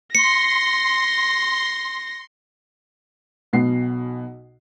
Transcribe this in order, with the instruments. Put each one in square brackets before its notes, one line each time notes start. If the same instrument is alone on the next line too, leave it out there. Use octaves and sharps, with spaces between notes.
[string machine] C6 [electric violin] A#6 [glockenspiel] C#7
[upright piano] B1 B2 C7